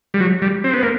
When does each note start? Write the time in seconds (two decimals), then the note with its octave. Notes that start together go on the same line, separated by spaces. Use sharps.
0.14 G3
0.21 F#3
0.42 G3
0.64 C4
0.73 B3
0.83 A#3